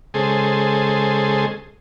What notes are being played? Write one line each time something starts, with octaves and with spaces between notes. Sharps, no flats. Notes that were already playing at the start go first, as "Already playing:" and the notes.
C#3 G#3 G#4 A4 C5